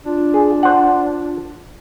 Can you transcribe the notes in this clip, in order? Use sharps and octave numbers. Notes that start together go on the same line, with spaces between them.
D4 F4
G#4
C5 F#5